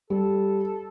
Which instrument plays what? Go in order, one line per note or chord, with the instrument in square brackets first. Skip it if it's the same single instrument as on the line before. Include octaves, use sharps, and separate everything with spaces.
[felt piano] G3 [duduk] A4